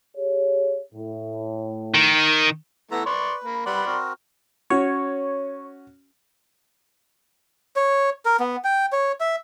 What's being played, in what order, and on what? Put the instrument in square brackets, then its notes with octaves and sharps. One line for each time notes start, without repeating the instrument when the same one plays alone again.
[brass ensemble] G4 G#4 C#5
A2
[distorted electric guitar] D#3
[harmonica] E3 A3 [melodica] B3 A4 A#5
[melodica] B4 [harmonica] D5 C6 C#6
[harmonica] A#3 B5
[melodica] G3 B4 F#5 [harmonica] D5 B5 C6
[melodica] C4 F#4 A#4
[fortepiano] C#4 F#4 [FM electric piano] C#5
[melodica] C#5
A#4
B3
G5
C#5
E5